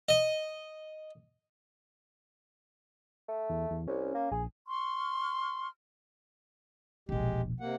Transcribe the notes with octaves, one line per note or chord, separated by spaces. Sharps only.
D#5
A3
E2
E2
C2 C#4
A#3
A#1 G#4
C6 C#6 F6
E1 A#1 G#3 G4
C3 A#3 F#5